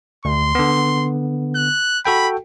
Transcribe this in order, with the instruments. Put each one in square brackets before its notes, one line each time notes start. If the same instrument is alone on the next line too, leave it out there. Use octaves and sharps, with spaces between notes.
[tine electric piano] D2 [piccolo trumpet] C6
[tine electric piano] D3 B3
[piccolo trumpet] F#6
[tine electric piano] F#4 A4 G5 [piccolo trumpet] B5